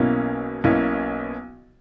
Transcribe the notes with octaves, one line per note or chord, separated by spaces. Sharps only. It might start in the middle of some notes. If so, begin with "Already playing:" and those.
Already playing: B1 B2 A#3 C#4 E4
B1 B2 A#3 C#4 E4